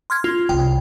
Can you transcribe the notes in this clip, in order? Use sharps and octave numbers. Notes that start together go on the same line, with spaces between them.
C6 F6 G#6
F4
C2 G5